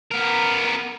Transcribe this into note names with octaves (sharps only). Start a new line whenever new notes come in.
B3 A#4